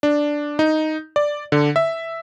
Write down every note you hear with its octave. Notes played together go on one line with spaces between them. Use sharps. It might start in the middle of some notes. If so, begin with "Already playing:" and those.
D4
D#4
D5
D3
E5